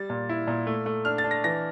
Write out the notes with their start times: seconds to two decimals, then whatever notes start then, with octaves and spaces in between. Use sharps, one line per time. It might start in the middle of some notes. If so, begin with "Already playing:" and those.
Already playing: G3 A6
0.10 A#2
0.29 E4
0.47 A#2
0.67 A3
0.86 A3
1.05 D4 F6
1.18 A6
1.24 D4
1.31 A#6
1.44 E3 A#6